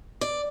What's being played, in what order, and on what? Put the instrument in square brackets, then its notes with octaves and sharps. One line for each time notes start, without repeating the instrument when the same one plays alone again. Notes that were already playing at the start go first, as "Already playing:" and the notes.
[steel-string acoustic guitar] D5